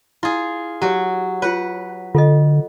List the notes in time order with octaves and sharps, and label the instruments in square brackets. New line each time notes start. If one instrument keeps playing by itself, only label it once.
[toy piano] E4 [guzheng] F4 G#4
[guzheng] F#3 F#4 [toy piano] G4 C#5
[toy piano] F4 C#5 [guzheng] B4 F#5
[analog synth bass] D3 [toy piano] F4 A4 D#5